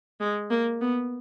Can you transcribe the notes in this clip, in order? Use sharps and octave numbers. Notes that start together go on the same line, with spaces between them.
G#3
A#3
B3